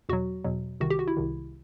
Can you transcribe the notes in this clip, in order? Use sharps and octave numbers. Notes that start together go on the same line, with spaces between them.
E2 B2 F#3 F#4
E2 B2 F#3
C2 C3 D#3 F#4
G4
F#4
E4
C2 C3 D#3